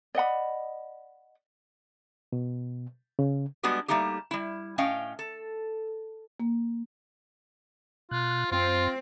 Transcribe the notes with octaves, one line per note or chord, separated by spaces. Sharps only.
D5 D#5 F#5 B5
B2
C#3
G3 G#3 B3 D4 F#4 G4
G3 A3 A#3 D#4 G4
G3 E4
A2 C#4 D#5 F5 G5
A4
A#3
B2 F4 F#6
F#2 C4 F4